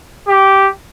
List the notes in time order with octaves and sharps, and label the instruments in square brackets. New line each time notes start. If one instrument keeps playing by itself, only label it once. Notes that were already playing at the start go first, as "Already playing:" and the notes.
[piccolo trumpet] G4